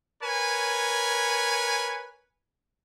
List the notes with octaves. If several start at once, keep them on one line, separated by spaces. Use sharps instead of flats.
A#4 B4 C#5 G#5